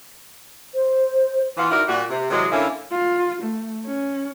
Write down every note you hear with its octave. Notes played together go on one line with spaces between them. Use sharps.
C5
E3 B3 F4
D#4 E4 F#4 A#4 D5
A#2 G3 F#4
C3
C3 E3 F#3 G#3
D3 A#3 C#4 E4
F4
A3
C#4